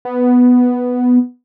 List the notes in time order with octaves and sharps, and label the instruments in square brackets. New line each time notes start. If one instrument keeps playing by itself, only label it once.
[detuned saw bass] B3